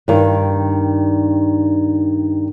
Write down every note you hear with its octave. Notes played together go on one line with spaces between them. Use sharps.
G2 D#3